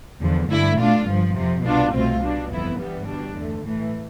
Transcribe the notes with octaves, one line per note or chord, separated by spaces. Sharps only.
E2 D3 F3
G2 D3 A3 E4
B2 A3 D4 F4
G1 G2 F3
F2 C3 F3
C2 B2 B3 D4 F4
C2 B2 A3 C4 F4
B2 G3 D4
G1 F2 E3 B3 E4
G1 G2 E3 G3 B3
B2 G3 D4
E2 D3 A3
A2 E3 A3